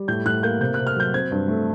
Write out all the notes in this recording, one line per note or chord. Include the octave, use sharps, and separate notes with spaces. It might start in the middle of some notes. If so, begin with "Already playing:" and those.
Already playing: G3
A2 G6
A2 F#6
A#3 G6
C3 G6
C3 F#6
F6
F#3 G6
C4 G#6
G2
A3